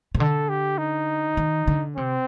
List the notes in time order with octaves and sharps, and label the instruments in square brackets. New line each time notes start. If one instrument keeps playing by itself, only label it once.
[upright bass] C3
[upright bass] D3 [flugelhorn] A4
[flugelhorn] G4
D#4
[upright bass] D#3
D3
[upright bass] C3 [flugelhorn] C4